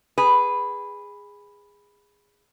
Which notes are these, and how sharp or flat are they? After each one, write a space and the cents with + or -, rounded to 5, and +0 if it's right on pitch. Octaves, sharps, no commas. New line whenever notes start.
G#4 -15 B4 +0